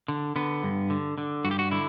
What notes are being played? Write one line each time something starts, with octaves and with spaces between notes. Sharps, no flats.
D3
D3 B3
G2
D3
D3
G2 F#4
G4
F#4
D3 E4